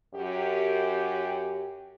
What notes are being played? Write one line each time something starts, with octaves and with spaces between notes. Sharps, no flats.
F#2 G4